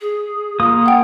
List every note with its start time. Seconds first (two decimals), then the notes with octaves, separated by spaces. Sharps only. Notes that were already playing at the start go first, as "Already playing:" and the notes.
0.01 G#4
0.60 A#3 F4 D#6
0.86 F#5 G5